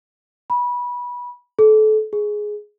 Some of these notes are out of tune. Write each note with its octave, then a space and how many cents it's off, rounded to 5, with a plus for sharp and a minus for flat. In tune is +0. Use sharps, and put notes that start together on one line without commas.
B5 -20
A4 -30
G#4 +10